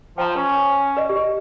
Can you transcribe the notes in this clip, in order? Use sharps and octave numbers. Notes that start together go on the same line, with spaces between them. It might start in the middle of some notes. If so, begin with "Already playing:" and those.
F3 G5 A5 A#5
C#4 B4
B4 D5 D#5
G4